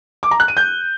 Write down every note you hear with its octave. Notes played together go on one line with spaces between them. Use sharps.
D6
A#5
F#6
D#7
G6